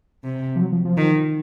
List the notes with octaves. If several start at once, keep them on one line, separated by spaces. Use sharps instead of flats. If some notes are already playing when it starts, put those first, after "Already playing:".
C3
F3
F#3
F3
F3
D#3